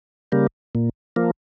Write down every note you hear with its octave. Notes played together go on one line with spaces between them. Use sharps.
C#3 G3 A#3
A#2
F3 A#3